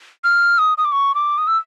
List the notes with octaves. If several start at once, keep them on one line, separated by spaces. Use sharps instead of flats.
F6
D#6
D#6
D6
C#6
D6
D#6
E6